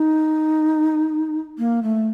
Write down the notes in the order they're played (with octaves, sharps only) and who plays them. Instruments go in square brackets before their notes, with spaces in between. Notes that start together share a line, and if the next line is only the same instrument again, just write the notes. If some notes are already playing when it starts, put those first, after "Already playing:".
Already playing: [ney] D#4
A#3
A3